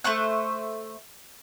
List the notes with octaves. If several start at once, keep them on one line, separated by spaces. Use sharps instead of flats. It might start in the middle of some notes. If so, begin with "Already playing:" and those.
A3 C5 C#6 F#6